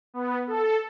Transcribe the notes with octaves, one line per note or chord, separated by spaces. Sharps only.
B3
A4